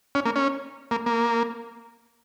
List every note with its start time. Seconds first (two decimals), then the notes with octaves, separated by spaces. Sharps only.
0.15 C#4
0.25 A#3
0.36 C#4
0.91 A#3
1.06 A#3